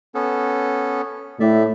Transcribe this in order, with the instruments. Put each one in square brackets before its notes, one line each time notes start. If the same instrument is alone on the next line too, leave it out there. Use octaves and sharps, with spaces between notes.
[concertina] B3 C#4 A4
[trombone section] A2 [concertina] D5 E5